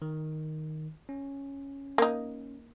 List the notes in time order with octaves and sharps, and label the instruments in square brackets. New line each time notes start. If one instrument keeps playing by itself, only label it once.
[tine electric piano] D#3
C#4
[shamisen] A#3 D#4